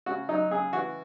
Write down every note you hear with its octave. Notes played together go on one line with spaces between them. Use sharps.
C#3 F#4
F#3 D#4
C#3 G#4
E3 F#4